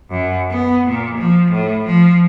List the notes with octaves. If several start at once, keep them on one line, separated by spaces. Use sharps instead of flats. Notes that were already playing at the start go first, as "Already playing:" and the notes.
F#2
B3
A#2
F3
A2
F3